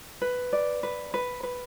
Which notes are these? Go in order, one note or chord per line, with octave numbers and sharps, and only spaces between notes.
B4
D5
B4
B4
B4